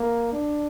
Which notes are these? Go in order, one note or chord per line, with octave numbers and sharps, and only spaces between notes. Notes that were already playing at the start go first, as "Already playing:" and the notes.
Already playing: A#3
D4